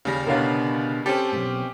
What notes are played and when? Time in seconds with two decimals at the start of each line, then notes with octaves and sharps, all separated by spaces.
0.05 D#2 C#3 G3 A#6
0.26 B2 D3 B3 A#4 C#5 F5
1.06 C4 C#4 G4 A4
1.32 B1 G#2